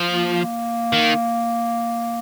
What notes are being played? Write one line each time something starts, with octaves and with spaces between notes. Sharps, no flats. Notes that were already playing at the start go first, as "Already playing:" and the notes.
Already playing: F3
A#3
D#3